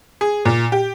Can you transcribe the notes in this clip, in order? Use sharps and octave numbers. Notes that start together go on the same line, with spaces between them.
G#4
A#2
G4